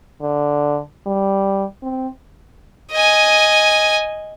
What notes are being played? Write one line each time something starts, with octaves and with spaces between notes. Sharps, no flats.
D3
G3
C4
D#5 G#5